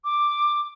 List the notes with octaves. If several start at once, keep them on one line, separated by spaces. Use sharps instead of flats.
D6